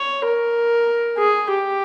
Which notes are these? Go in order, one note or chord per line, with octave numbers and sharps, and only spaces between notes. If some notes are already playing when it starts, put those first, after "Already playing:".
Already playing: C#5
A#4
G#4
G4